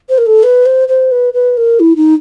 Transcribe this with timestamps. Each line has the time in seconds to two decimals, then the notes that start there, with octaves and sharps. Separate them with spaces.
0.08 C5
0.17 A#4
0.26 A4
0.43 B4
0.65 C5
0.88 C5
1.11 B4
1.33 B4
1.57 A#4
1.79 E4
1.96 D#4